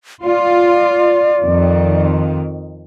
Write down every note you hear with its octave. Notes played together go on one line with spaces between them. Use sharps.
F4 D5
F2 D#3